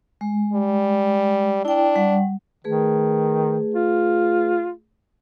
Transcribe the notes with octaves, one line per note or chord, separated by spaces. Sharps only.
G#3
G3
D4 E4 G5
G3 F#5
D#3 A3 G#4 B4
F4